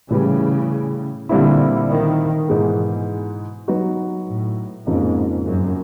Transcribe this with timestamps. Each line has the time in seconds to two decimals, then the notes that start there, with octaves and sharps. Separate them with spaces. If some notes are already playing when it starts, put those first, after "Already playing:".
0.10 A2 C#3 E3 G3
1.29 A#2 D3 G3 C4 E4
1.89 D#3
2.48 G#2 B2 E3 G#3 B3
3.68 F#3 B3 D#4 F#4
4.27 A2
4.87 F2 G#2 C#3 F3 A#3 D#4
5.46 F#2